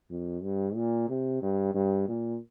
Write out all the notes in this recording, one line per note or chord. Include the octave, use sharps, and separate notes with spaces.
F2
G2
A#2
C3
G2
G2
A#2